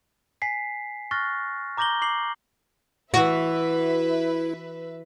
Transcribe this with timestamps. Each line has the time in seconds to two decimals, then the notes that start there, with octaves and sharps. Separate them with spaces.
0.42 G#5 B6 C7
1.11 C#6 F6 F#6 A6 A#6
1.77 A#5 D6 G6 A#6 F#7 G7
2.02 D6 C7 F#7
3.14 E3 E4 F#4 B4 E5